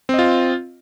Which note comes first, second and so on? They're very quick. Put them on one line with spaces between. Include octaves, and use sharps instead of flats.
C4 D#5 F4